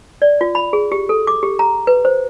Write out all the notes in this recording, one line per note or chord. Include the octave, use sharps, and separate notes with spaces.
D5
F4
B5
G#4
G4
A4
D6
G4
A#5
B4
C5